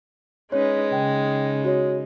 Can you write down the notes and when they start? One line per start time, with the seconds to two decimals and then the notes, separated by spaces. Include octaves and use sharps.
0.52 G#3 C#4 D#4 B4 C#5
0.92 C#3 D#4 G5
1.65 F#4 C#5